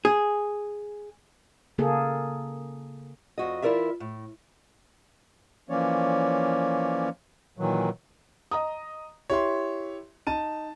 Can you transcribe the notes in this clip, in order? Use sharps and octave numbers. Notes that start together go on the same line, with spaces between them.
G#4
C#3 A#3 G#4 A4
F2 F#4 D#5
E3 E4 F4 A#4 D5 E5
A2
E3 F3 A#3 C#4 C#5 D5
A#2 D#3 E3 F#3
D#5 A#5 D#6
E4 G4 C#5 E5 C6
D#4 A5 D#7